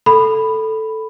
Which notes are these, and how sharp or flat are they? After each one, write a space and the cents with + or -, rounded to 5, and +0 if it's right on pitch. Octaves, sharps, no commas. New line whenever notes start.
A4 +0 B5 +0